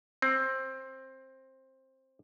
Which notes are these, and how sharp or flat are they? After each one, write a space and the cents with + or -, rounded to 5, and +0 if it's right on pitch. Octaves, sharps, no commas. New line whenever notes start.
C4 +15